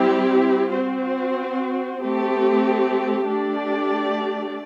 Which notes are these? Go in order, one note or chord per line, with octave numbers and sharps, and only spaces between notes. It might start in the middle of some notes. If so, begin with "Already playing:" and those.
Already playing: G3 C4 E4 G4
C4 F#4 C5
A3 C4 G4
A3 D4 G4 D5